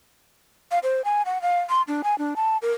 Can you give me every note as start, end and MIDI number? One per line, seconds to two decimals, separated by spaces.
0.71 0.79 77
0.83 1.02 72
1.05 1.22 80
1.26 1.41 78
1.42 1.59 77
1.70 1.82 84
1.88 2.02 62
2.04 2.17 80
2.18 2.34 62
2.36 2.57 81
2.62 2.72 70